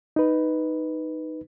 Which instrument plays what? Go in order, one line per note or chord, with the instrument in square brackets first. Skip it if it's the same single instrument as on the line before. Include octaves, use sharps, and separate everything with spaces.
[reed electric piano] D#4 B4